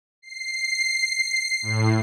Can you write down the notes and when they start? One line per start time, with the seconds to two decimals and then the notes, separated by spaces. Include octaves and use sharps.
0.22 C7
1.62 A2